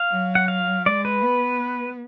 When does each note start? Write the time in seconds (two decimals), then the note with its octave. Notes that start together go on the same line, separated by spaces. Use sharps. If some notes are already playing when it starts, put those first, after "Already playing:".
Already playing: F5
0.11 F#3
0.35 F#5
0.48 F5
0.86 G#3 D5
1.05 B4
1.23 B3